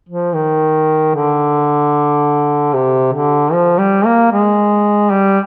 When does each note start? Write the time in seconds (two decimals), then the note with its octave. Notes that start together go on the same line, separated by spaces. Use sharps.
0.09 F3
0.35 D#3
1.15 D3
2.74 C3
3.13 D3
3.52 F3
3.78 G3
4.05 A#3
4.32 G#3
5.11 G3